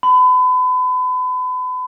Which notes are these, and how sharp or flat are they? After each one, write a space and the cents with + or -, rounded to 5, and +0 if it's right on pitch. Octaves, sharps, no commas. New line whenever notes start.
B5 +35